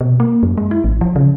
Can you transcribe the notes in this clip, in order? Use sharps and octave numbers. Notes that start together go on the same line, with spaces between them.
B2
A#3
F#2
G#3
E4
A1
F3
C#3